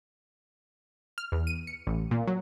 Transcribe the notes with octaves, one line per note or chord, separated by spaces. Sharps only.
F6
E2
D#7
C#7
A1
A#2
F#3